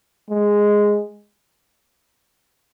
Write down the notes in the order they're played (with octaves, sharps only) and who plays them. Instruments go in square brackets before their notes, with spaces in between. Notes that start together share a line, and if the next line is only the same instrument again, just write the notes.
[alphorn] G#3